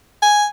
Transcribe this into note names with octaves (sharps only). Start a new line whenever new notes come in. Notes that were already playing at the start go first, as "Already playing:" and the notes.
G#5